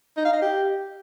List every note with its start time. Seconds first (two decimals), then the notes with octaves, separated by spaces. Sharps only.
0.17 D#4
0.25 F5
0.33 D#5
0.42 G4